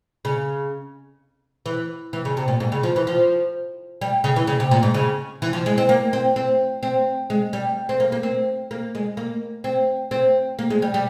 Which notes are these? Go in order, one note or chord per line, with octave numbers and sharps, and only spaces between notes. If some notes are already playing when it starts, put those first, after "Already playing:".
C#3
E3
E3
C#3
C3
A#2
G#2
C#3
F3
E3
F3
G3
C#3
E3
C#3
C3
A#2
G#2
C#3
E3
F3
G#3
C4
A#3
C4
C4
C4
G#3
G3
C4
A#3
A#3
C4
A#3
G#3
A#3
C4
C4
A#3
G#3
G3
G3